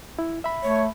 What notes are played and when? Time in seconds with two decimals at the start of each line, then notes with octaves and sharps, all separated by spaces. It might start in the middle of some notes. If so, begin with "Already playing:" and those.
0.19 E4
0.44 E5 B5
0.63 A3 C#5